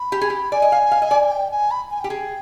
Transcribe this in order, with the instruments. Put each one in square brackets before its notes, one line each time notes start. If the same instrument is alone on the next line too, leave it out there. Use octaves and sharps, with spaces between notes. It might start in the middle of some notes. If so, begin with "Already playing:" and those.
Already playing: [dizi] B5
[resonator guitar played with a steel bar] G4
G#4
G4
[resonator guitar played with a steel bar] D5 [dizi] G#5
[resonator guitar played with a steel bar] D#5
F5
F5
D#5
D5
[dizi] G5
G#5
B5
G#5
[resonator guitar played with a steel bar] G4 [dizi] G5
[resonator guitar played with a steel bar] G#4